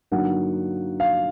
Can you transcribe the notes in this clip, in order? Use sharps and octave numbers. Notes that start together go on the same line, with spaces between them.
G2 D3 F#3 A#3 D#4 F#5
F5